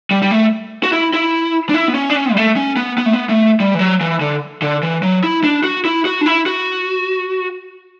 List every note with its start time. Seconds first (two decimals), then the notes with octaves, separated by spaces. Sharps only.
0.11 G3
0.22 G3
0.31 A3
0.83 F#4
0.92 E4
1.14 E4
1.69 D4
1.74 E4
1.88 B3
1.95 C#4
2.10 D4
2.16 C#4
2.32 G3
2.37 A3
2.56 C#4
2.77 B3
2.98 B3
3.06 A3
3.13 B3
3.29 A3
3.60 G3
3.74 E3
3.79 F#3
4.01 E3
4.21 D3
4.62 D3
4.83 E3
5.03 F#3
5.24 E4
5.44 D4
5.64 F#4
5.85 E4
6.05 F#4
6.21 D4
6.26 E4
6.46 F#4